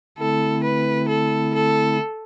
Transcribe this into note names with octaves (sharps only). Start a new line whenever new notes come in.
D3 A3 C4 E4 A4
B4
A4
A4